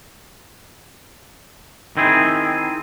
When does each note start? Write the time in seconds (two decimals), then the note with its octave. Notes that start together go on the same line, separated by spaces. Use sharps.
1.97 D#3 C4 E4 G#4